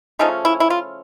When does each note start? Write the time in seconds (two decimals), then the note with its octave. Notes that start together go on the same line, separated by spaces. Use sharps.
0.19 C#3 F3 A3 C#4 D#4
0.45 E4
0.60 E4
0.70 F4